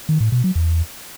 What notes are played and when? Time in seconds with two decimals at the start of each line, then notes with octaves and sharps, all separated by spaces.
0.09 D#3
0.20 A2
0.32 B2
0.44 F#3
0.55 E2